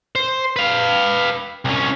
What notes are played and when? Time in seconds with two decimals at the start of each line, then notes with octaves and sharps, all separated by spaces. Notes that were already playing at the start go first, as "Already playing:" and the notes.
0.15 C5
0.56 B4 F5
1.65 C2 C#4